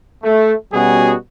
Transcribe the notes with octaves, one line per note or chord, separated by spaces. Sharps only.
A3
B2 G3 C#4 F#4 G#4